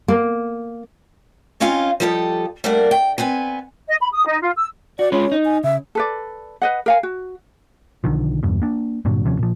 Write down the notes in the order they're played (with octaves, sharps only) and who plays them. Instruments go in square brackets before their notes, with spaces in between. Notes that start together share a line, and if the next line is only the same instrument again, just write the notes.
[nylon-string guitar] A#3
[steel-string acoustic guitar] C4 C#4 D#4 F4 F5 G#5
F3 G3 G4 A4 C5 D#5
G3 A3 A#3 D4 A#4 F#5
G5
B3 C4 B4 G#5
[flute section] D#5
B5
D#6
D#4
F4
E6
[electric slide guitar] F#4 [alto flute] D5
[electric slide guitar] G#3 F4 B4 [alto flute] C#4
[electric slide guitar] D#4
[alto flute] G#5
[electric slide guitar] C#3 [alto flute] E5
[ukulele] A4 B4 D5
B4 D#5 F#5
A#4 F5 G#5
F#4
[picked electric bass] B1 D3 D#3 F3
E2 G2 B2
A#3 D4
G2 A#2 D3 F#3
D#2 C3 F3 C#4
A#2 F3